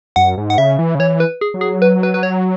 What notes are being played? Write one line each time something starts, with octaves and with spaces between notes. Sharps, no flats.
F#2 F#5
G#2
F#5
C#3 E5
E3
C#3
E3 C#5
B4
G#4
F#3
G#4
B4
B4
B4
C#5